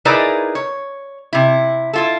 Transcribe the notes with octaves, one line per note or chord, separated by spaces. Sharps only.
D#4 E4 G#4 A#4 B4 D5
C#5
C3 E4
E4 F4 A4